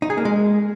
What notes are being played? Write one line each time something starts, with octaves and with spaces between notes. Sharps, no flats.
D#4
G#4
A#3
G#3